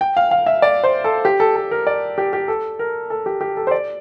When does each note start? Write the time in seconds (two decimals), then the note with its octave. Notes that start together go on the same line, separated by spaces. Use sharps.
0.01 G5
0.17 F5
0.31 F5
0.46 E5
0.62 D5
0.83 C5
1.04 A4
1.25 G4
1.40 A4
1.56 A4
1.71 A#4
1.87 D5
2.18 G4
2.33 G4
2.48 A4
2.79 A#4
3.10 A4
3.26 G4
3.41 G4
3.57 A4
3.67 C5
3.71 D5